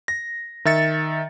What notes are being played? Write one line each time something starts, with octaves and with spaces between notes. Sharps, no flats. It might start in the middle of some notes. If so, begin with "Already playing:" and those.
A#6
D#3 E5 A6 C#7